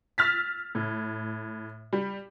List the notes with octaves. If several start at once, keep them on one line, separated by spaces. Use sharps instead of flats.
E6 F6 A6 B6
A2
G3